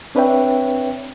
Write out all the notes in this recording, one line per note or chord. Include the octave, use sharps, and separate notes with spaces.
C4 D4 B4 C#5 E5 G5